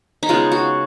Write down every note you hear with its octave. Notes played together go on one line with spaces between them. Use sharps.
D#4
C#3 G#3 B3 F4
F#4